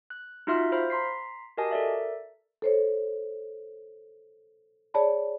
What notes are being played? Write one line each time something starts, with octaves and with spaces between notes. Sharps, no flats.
F#6
D#4 F4 F#4 E5 C6 F6
C5 F5 B5 F6
A#5 C6 B6 C7
F#4 G4 A#4 D#5 G#5 A5
A4 A#4 D5 E5
A4 C5 C#5
G#4 C#5 D5 A5 B5